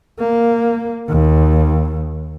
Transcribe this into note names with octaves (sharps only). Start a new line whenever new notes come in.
A#3
D#2